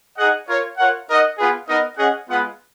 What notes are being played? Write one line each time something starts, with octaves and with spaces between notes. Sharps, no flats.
D#4 G#4 D#5 F#5
F4 A#4 C#5
F4 A#4 C#5 F#5
D#4 A#4 D#5 F#5
B3 F4 G#4 B4
B3 D#4 A#4 D#5
C#4 G#4 D#5 F#5
G#3 B3 F4 B4 F#5